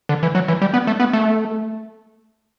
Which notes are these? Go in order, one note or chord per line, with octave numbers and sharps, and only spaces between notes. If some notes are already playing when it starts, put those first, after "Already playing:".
D3
E3
F#3
E3
G3
B3
A3
B3
A3